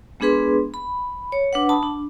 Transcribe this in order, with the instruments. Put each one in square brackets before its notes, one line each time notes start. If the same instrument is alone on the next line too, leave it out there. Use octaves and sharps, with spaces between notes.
[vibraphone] G#3 B3 D4 G#4 B4 C6
B5
C#5
D4 B4 F#5
A5 B5 D#6
D4